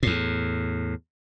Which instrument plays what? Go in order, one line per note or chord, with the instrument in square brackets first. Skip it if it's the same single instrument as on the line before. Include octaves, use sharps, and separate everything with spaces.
[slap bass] E2 A2